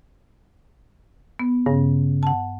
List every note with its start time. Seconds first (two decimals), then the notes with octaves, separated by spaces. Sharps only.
1.39 B3
1.66 G2 C#3
2.23 F#5 A5